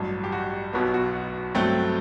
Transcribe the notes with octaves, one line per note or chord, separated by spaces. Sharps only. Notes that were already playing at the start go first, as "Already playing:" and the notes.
Already playing: A1 G2 F#3
G4
F#4
B1 B2 F#3 B3
F#4
G2 F#3 A3 C4 G5